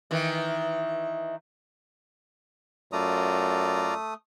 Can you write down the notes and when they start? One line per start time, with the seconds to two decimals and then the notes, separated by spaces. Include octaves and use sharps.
0.11 D#3 E3
2.93 F#2 A3 F4 D5 A#5 D#6